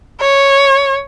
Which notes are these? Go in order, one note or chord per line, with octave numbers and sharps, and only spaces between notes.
C#5